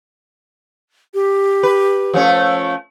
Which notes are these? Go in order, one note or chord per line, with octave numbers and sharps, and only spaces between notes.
G4
B4
F3 A3 C#4